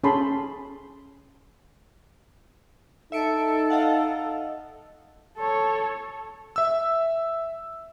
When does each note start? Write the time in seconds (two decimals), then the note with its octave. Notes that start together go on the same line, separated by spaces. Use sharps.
0.04 C#4 G#4 A4 A5 B5 C6
3.12 D#4 A4 E5 C#7 D7
3.70 D#5 F5 F#5
5.38 A4 C#5
6.56 E5 E6